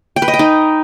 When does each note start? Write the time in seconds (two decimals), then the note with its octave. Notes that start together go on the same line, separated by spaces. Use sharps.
0.16 G5
0.22 B4
0.28 D#5
0.34 G5
0.39 D#4